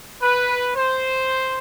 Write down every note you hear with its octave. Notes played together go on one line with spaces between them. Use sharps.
B4
C5